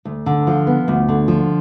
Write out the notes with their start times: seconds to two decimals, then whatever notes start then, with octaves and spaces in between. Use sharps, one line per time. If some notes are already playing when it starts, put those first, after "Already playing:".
0.05 D2
0.26 D3
0.47 F3
0.67 B3
0.88 D2
1.09 D3
1.28 F3